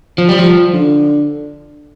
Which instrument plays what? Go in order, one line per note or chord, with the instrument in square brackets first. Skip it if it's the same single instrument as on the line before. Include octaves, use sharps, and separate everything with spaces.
[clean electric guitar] F3
G3
F3
[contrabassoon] D3